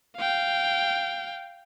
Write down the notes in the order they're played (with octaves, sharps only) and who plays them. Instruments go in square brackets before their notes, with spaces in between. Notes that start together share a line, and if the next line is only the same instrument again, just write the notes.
[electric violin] F5 G5